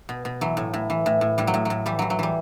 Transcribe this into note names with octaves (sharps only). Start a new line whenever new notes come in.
B2
B2
E3 F#3
A2
A2
E3
A2
A2
A2 G3
F#3
A2
A2 F#3
E3 G3
E3 F#3
F#3
E3 G3